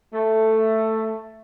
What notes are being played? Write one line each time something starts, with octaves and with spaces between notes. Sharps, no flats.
A3